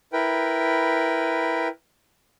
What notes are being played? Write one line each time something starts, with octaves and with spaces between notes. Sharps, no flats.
E4 A#4 B4 G5